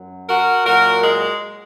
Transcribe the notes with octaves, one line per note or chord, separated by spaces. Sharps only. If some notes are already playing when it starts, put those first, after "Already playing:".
Already playing: F#2 F#3
F#4 A#4
A#2 F#3 F#4 A#4
G#3